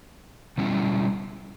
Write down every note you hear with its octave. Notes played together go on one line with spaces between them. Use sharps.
B2 G3 C#4 E4